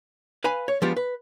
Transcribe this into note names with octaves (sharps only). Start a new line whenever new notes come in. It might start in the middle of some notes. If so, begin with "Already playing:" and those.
B4 F5 G#5 B5
C#5
F3 G#3 B3 D4 F4 G4
B4